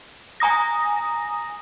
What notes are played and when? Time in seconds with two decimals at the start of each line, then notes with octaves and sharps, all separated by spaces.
0.40 G#5 A#5 D#6 A#6